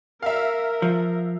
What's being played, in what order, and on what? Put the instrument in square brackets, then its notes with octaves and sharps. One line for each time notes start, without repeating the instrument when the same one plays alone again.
[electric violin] A#4 [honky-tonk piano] E5 F5
[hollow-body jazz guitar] F3